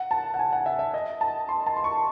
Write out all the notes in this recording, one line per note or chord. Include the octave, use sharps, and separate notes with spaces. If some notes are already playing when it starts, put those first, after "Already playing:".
Already playing: F#5
A5
F#5
G#5
F#5
E5
E5
D#5
A5
C6
A5
C6
C#6